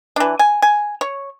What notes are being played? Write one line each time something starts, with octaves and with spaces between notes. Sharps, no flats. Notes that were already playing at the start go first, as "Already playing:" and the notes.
E3 D4
G#5
G#5
C#5